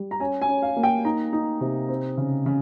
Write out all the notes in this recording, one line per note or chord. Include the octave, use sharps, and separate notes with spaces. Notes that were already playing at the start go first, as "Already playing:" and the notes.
Already playing: G3
A#5
C#4 G#5
G#5
C#4
F5
A#3
G5
D#4 A#5
D#4
C3
C4
C#3
C#3